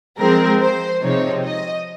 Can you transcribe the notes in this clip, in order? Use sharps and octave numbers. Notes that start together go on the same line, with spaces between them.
F3 G#3 C4 A#4
C5
C3 F3 G#3 C4 D#4 C#5
D#5